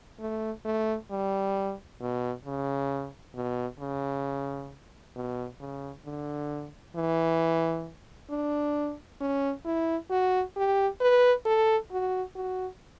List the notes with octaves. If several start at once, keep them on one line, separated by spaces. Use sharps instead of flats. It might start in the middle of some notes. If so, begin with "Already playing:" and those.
A3
A3
G3
B2
C#3
B2
C#3
B2
C#3
D3
E3
D4
C#4
E4
F#4
G4
B4
A4
F#4
F#4